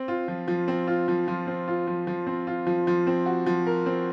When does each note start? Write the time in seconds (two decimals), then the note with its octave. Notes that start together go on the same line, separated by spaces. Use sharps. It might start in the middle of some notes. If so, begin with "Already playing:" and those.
Already playing: C4
0.08 F4
0.28 F3
0.48 F3
0.68 C4
0.87 F4
1.08 F3
1.28 F3
1.47 C4
1.68 F4
1.87 F3
2.07 F3
2.27 C4
2.47 F4
2.67 F3
2.87 F3
3.07 C4
3.26 F#4
3.46 F3
3.67 A#4
3.86 C4